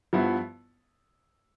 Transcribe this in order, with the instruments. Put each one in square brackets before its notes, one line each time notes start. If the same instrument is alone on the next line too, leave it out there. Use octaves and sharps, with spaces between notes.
[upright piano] G2 F3 B3 E4